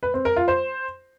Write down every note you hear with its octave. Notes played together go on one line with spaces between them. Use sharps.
B4
C4
A#4
F4
C5